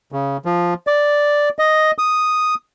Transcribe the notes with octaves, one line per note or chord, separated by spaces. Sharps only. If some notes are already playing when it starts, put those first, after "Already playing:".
C#3
F3
D5
D#5
D#6